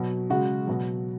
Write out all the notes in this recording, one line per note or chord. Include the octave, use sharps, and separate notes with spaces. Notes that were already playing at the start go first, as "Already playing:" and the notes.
Already playing: B2 F#3
C#3 G#3 F#4
B2 F#3